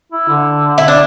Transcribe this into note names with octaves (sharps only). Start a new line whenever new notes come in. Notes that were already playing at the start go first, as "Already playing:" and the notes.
E4
D3
E4
D4